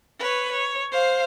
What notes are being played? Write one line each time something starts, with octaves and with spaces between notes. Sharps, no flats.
B4 C#5
C#5
C5 F5